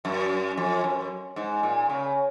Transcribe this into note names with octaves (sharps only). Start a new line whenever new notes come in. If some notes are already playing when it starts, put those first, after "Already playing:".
F#2
F2
F#2
G#2
A#2
C#3